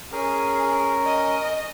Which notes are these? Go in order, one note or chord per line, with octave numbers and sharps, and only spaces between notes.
C#4 G#4 A#4
D#5